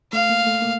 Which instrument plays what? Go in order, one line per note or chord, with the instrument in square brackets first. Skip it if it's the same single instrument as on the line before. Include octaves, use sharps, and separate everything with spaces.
[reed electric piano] A3 [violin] F5
[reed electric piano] A#3
A3
A#3